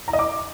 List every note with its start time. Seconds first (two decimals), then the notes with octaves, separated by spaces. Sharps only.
0.08 A#5
0.13 D#5
0.19 D6